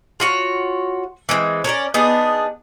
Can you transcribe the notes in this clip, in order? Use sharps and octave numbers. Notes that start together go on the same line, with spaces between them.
F4 F#4 C#5
E3 G#3 A#3 C4
C#4 A#4 B4 D5
B3 D4 D#4 G#4